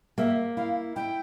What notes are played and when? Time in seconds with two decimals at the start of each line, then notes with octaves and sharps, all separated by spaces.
0.18 A#3 E5
0.57 E4 F5
0.96 E4 G5